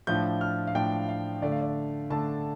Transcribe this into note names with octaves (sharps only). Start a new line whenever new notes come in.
A2 F3 D4 G6
F6
F5
A2 F3 D4 G5
F5
D3 A3 D4 D5
F5
D5
D3 A3 D4 A5